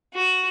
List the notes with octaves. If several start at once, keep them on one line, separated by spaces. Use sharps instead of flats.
F#4